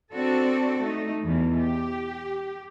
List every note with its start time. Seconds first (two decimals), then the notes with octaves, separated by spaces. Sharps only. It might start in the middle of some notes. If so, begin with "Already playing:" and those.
0.12 C4 D4 F#4 A4
0.83 A3 D#4
1.23 E2 B2 E3
1.58 G4